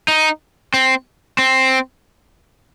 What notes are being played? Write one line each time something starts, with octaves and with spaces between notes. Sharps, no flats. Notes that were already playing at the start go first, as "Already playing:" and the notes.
D#4
C4
C4